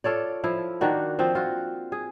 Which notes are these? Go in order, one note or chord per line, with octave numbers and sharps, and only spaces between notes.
F4 A4 C#5 D5
F3 E4
D#3 A#3 D4 F#4
F3 C4
F4 F#4
G#4